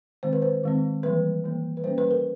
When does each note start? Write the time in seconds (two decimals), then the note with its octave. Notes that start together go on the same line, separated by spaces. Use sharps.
0.23 D#3 G#3 C4 C5
0.33 B4
0.42 C5
0.63 D#3 G#3 C4
1.03 E3 G3 A#3 B4
1.44 E3 G3 A#3
1.77 B4
1.84 G3 A#3 C#4 C5
1.98 B4
2.11 A#4